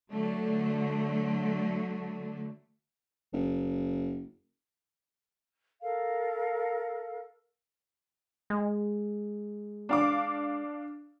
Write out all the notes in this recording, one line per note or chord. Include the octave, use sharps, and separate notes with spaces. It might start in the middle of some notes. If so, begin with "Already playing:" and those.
D3 F#3 A3
F#1
A4 A#4 F5
G#3
D4 F5 D6